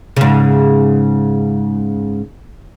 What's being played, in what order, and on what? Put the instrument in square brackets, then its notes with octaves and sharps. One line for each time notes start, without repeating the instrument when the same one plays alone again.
[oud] G#2 C#3